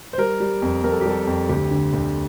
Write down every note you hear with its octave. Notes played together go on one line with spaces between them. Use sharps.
C5
G3 A#4
G3
F2
F2 A#4
A4
G4
G3 A4
F2
D2 G4
D3
D2